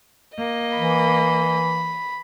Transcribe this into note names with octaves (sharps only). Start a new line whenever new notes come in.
A#3 D#5
E3 B5